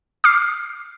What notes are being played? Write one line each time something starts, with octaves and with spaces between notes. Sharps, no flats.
D6 F6 C7